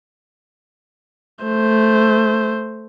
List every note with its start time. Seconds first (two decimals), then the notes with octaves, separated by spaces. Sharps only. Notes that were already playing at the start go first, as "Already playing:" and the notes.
1.44 A3 C5